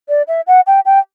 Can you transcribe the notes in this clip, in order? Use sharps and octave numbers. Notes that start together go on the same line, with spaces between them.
D5
E5
F#5
G5
G5